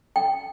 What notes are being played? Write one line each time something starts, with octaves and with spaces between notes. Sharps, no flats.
G5